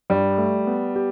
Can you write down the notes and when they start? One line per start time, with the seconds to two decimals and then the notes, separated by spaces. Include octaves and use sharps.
0.10 G2 G3
0.38 A3
0.67 B3
0.96 G4